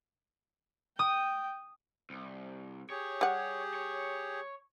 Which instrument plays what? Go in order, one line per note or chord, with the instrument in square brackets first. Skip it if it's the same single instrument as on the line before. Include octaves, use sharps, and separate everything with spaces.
[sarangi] G5 [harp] D#6
[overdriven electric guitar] C2
[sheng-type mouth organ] G4 G#4 [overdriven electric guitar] C#5
[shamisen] G3 F#5
[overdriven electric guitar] C#5